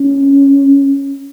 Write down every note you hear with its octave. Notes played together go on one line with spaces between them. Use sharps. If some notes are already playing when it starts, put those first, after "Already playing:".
Already playing: C#4